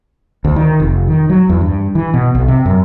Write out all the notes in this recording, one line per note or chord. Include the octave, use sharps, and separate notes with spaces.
D2
D#3
F1
D#3
F#3
E2
G2
E3
B2
B1
C3
F#2